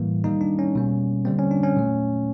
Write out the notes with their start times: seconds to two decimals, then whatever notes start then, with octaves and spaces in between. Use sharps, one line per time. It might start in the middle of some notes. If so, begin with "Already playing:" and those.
Already playing: A2 E3 G3 A#3
0.24 D#3 G3 A#3 D#4
0.41 D4
0.59 C#4
0.75 B2 G3 A#3
1.25 D3 G3 A#3 C4
1.39 C#4
1.51 D4
1.63 C#4
1.76 A#2 F#3 A3